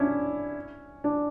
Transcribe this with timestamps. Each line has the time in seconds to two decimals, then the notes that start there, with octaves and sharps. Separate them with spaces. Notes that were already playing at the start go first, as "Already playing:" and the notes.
Already playing: C#4 D4 E4
1.04 D4